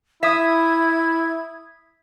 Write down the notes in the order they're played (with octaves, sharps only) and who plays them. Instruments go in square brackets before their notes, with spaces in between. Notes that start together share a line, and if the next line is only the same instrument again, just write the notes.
[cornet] E4 [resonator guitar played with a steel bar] E5 [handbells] D#6 B6 [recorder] G#6